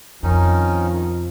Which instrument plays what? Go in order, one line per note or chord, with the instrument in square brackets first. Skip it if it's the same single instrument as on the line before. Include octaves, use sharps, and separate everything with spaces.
[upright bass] F2 C3 [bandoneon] D#3 C#4 D#4 [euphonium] F3